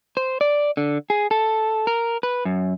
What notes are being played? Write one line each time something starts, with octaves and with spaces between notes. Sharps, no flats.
C5
D5
D3
G#4
A4
A#4
B4
F#2